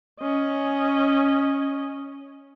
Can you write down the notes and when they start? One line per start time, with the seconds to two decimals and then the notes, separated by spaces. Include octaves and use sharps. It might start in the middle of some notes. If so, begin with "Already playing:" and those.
0.21 C#4 D#5